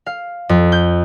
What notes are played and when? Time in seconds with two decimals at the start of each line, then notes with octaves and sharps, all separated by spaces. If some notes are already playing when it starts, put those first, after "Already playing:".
0.06 F5
0.49 F2
0.72 G6